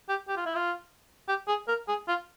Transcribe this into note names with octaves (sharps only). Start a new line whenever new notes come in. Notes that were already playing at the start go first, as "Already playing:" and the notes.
G4
G4
F4
E4
F4
G4
G#4
A#4
G#4
F4